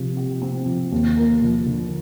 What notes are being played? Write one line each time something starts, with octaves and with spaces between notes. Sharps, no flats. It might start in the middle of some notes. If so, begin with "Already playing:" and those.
Already playing: C3 F3
G4
C4
F3
D#2
A#3
F3
D3